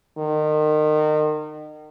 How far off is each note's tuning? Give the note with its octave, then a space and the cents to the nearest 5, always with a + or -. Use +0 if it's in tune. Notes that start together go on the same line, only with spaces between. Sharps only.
D#3 -30